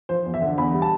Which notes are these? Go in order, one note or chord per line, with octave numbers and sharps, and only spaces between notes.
F3 C5
E2
E5
D3
E2 B5
G3
A5